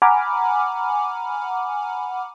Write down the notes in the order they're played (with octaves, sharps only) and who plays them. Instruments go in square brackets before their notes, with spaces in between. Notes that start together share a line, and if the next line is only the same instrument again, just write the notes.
[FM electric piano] F#5 G#5 A#5 B5 D6 F6